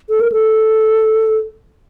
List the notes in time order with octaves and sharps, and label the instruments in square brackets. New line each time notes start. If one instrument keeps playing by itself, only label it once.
[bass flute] A4
A#4
A4